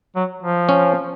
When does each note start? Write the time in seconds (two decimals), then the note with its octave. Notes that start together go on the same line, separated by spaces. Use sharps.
0.16 F#3
0.42 F3
0.69 C#4